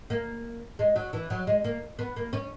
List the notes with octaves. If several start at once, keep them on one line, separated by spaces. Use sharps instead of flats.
A#3
G#3
F#3
E3
F#3
G#3
A#3
B3
A#3
C#4